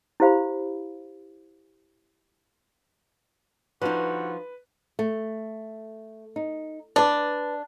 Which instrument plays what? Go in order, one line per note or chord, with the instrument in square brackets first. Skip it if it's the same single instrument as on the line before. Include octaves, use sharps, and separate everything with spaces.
[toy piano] E4 G4 C5 F5 B5
[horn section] G2 D3 F#4 [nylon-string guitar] F3 D#4 [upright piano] B4
[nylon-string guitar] A3
D#4
[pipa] D4 [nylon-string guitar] B4 D5